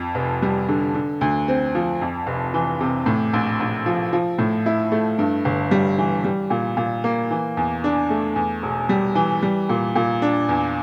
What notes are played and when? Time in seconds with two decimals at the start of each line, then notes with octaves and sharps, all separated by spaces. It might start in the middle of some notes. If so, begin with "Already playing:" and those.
Already playing: F2
0.15 F1
0.42 G3
0.69 D3
0.94 D3
1.21 D2
1.48 C4
1.75 F3
2.01 F2
2.27 F1
2.54 E3
2.80 C3
3.06 A2
3.33 A#1
3.60 A#1
3.86 F3
4.13 F3
4.39 A2
4.66 E4
4.92 A3
5.19 G2
5.45 G1
5.71 G3
5.98 E3
6.24 G3
6.50 A#2
6.77 A#2
7.04 A#3
7.31 E3
7.57 E2
7.84 D4
8.10 A3
8.36 E2
8.63 E1
8.89 G3
9.15 E3
9.42 G3
9.69 A#2
9.95 A#2
10.22 D4
10.49 E2